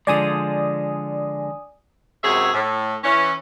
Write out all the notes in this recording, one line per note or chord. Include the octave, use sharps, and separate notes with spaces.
D3 F3 G#3 D5 G#5 D#6
F#2 C3 G#3 G#4 C#5 E5
A2
E3 C#4